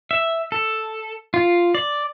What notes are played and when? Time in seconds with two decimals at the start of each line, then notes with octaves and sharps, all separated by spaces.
0.11 E5
0.52 A4
1.34 F4
1.75 D5